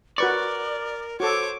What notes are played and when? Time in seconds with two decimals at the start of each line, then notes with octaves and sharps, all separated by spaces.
0.18 F#4 A#4 B4 D5 C#6
1.20 F#4 A4 C5 C#5 D6